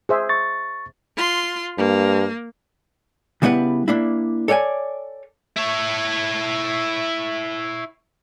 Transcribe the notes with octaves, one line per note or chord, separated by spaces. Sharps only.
G#4 C5 E5
C#6 A6
F4 C6
G2 A#3
C#3 G3 B3 E4 B4
A#3 D4 E4
A4 C#5 D5 G5 G#5
E4 C#5